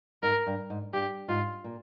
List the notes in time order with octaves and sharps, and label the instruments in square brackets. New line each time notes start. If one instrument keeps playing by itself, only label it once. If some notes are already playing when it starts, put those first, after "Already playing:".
[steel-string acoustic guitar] G#2 [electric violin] A#4
[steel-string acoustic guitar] G2
G#2
[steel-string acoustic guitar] G2 [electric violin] G4
[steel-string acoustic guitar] G#2 [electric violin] F4
[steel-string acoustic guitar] A#2